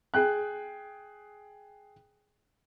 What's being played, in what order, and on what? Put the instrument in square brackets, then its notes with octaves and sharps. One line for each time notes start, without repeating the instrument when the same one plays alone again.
[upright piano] G#4 G5 F#6